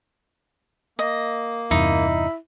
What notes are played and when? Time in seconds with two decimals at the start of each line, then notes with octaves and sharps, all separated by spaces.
0.99 A#3 D#5
1.71 E2 G2 C3 D#4 E4